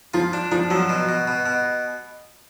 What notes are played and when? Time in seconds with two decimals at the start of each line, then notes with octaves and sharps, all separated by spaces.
0.14 F3 F4
0.33 D4
0.52 F3 D4
0.70 F3 F#3
0.89 B2
1.09 B2
1.28 B2
1.46 B2